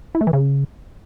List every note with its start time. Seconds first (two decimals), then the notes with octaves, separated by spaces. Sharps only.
0.15 E4
0.21 A3
0.27 E3
0.33 C#3